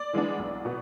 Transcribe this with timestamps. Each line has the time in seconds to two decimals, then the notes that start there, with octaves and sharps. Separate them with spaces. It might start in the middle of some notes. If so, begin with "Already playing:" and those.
Already playing: D5
0.13 E3 G#3 B3 D4
0.39 B1
0.65 B2 B3